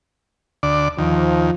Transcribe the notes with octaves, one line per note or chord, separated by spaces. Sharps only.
D2 D5
D#2 F3